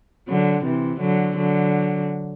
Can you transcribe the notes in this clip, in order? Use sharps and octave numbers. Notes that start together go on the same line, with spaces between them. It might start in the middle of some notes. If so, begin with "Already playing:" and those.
D3 F#3
C3 E3
D3 F#3
D3 F#3